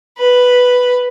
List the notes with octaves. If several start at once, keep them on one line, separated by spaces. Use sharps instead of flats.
B4